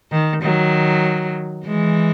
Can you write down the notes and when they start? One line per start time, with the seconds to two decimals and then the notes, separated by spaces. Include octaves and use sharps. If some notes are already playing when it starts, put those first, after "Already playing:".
0.11 D#3
0.42 D#3 F#3
1.66 E3 G#3